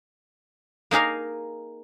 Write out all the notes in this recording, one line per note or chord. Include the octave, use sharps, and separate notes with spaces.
A#3 D#4 G#4 A#4 F5